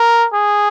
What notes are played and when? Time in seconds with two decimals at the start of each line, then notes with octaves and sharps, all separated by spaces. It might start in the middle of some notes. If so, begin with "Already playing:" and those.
Already playing: A#4
0.33 G#4